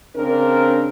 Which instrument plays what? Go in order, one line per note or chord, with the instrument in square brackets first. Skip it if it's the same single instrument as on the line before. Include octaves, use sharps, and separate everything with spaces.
[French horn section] C#3 C4 D4 A#4